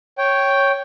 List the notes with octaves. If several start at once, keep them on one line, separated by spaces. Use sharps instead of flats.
C#5 G5